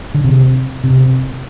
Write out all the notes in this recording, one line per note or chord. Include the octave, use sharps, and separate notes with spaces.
D3
C3
C3